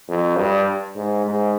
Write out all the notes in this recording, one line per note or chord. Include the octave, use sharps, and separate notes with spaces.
F2
G2
G#2
G#2